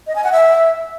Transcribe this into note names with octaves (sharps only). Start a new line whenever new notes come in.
D#5
G#5
F#5
E5